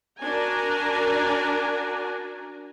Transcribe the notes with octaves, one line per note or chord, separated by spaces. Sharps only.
D4 F#4 A#4 D5 G#5 A#5